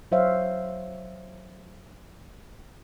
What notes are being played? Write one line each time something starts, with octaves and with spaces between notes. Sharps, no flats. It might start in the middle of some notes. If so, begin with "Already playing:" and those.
F#3 C5 C#5 E5 F5